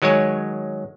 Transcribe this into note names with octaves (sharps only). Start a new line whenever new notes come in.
D#3 F#3 G#3 C#5 G#5